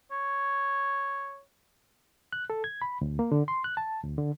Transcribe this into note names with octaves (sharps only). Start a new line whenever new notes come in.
C#5
F#6
A4
G#6
B5
D2
A#3
D3
C6
F#6
A5
D2
D3